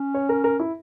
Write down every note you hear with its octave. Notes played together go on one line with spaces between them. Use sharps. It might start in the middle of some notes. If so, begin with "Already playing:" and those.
Already playing: C#4
C#5
A#4
A#4
E4